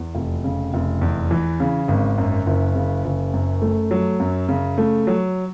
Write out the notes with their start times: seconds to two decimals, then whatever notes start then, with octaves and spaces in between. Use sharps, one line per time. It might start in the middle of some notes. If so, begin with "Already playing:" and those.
Already playing: E2
0.15 F1
0.44 C#3
0.74 F1
1.01 E2
1.31 E3
1.60 C#3
1.88 G#1
2.18 F#2
2.47 F#1
2.75 C#3
3.05 F#1
3.34 F#2
3.62 A3
3.91 F#3
4.20 F#2
4.49 C#3
4.78 A3
5.07 F#3